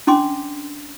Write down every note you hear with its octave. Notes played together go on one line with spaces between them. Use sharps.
C#4 D4 C6 D6